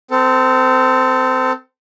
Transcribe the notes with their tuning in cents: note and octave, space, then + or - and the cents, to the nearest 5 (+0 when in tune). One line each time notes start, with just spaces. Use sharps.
C4 -20 A4 +25